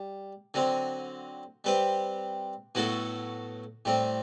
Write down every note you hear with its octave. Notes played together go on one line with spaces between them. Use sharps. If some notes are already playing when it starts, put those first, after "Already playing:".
Already playing: G3
D3 F#3 C4
G3 C4 G4 B4
A2 F#3 B3 F#4 A4
A2 G3 C4